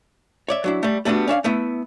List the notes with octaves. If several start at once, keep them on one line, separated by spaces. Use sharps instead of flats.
C#5 D5 E5
F#3 D4 E4
G3 A3
G3 A3 B3 D4 F#4
C#4 D4 E5 F5
A3 B3 E4